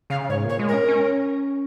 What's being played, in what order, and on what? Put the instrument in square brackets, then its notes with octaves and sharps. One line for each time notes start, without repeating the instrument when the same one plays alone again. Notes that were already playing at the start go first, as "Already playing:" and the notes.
[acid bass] C#3 [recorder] F5
[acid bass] G#2 [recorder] C#5
[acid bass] A#2 [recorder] C#5
[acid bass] G#3
[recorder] A#4
[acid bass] C#4
C#4